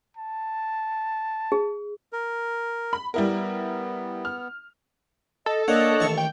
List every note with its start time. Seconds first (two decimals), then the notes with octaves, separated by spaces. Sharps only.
0.17 A5
1.52 G#4
2.13 A#4
2.93 B5
3.14 G3 B3 E4 A#4
4.25 F6
5.46 A4 D#5
5.68 A#3 D4 C#5 D#5 F#5
6.00 A1 D#2 C#6
6.18 G5